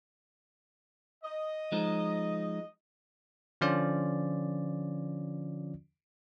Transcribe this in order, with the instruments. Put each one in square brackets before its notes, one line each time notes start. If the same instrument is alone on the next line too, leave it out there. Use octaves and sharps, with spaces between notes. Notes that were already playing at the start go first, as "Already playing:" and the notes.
[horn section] D#5
[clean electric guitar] F3 G#3 D#4
[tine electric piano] D3 F3 C#4 F4 D5